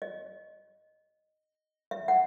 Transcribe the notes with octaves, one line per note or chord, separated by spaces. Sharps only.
D#5
E5
F#5